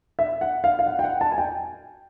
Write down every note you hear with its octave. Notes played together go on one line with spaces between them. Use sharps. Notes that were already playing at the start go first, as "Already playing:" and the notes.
E5
F#5
F5
F5
F#5
G5
F#5
A5
G#5
G5